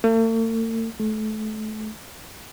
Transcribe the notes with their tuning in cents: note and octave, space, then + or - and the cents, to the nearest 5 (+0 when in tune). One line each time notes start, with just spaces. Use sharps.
A3 +45
A3 -30